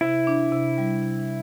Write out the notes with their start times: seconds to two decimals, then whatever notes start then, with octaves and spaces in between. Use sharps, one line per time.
0.01 C3 E4
0.27 D4
0.52 C3
0.78 G3
1.03 C3